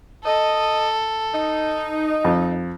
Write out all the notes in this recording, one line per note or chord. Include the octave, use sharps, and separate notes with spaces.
A4 D#5
D#4
F2